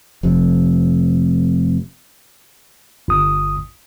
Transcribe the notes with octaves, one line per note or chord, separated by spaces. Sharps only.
F1 F2 C3
G1 D#6